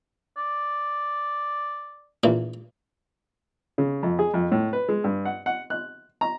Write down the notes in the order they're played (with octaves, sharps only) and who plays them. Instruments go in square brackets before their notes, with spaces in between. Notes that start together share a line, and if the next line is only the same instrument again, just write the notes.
[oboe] D5
[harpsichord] A#1 A#2 E3
[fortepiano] C#3
F2
G#4
F2
A2
B4
G#3
G2
F#5
F#5
F#6
A#5